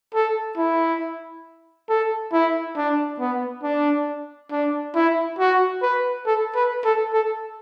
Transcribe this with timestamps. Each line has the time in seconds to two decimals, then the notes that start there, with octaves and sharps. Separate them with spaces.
0.14 A4
0.57 E4
1.89 A4
2.32 E4
2.77 D4
3.20 B3
3.63 D4
4.51 D4
4.95 E4
5.39 F#4
5.82 B4
6.26 A4
6.55 B4
6.85 A4
7.13 A4